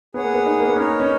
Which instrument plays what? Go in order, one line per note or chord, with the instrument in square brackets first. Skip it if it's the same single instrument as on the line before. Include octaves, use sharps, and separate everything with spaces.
[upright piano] B3 [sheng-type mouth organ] G#4 C#5 F#5
[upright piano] A#3
B3
D#4
A#3
B3
[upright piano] C#4 [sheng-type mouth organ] D#4 A#4 C#5
[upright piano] C#4